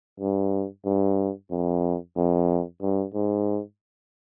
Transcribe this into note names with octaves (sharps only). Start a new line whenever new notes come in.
G2
G2
F2
F2
G2
G#2